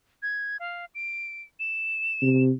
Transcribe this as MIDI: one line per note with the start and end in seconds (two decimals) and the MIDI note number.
0.22 0.57 92
0.60 0.85 77
0.95 1.43 98
1.60 2.42 100
2.22 2.51 48